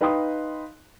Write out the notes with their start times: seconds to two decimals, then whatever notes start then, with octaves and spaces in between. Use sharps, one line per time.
0.01 D#4 B4 F5 G5 C6 D#6